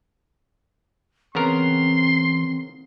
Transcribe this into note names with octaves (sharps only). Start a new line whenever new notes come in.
C#3 E3 B3 C4 A#4 C6